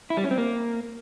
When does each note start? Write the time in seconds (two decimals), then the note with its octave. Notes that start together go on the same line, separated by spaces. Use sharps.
0.10 E4
0.17 G3
0.24 C#4
0.31 C4
0.38 A#3